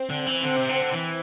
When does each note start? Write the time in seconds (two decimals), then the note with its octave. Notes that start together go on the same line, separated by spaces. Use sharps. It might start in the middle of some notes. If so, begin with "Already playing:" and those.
Already playing: C4
0.10 D3
0.27 E3
0.43 D3 C4
0.56 C3
0.69 D3
0.92 E3